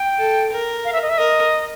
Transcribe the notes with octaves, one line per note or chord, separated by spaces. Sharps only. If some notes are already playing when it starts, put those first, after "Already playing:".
Already playing: G5
A4
A#4
F5
E5
D#5
E5
A#4 D#5